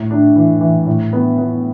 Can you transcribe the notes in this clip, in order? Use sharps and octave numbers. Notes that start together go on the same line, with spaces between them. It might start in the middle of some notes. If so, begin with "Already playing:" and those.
Already playing: A2 A3
D4
E3
E3
A2
B3
B3